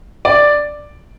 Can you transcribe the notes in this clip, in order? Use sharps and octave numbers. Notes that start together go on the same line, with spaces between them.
D5